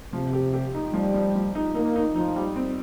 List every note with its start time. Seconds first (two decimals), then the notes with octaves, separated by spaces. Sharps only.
0.13 C3 F3
0.33 G4
0.54 G4
0.74 D#4
0.93 F3 G3
1.14 F3
1.35 F3
1.55 D#4
1.75 A#3 D#4
1.96 D#4
2.15 F3 D#4
2.36 G3
2.56 C4